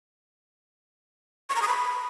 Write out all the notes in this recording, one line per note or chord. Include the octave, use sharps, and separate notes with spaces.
C#6
A#5
D#6
B5